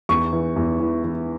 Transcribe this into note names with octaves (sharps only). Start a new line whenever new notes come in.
E2 C#6
E3
E2
E3
E3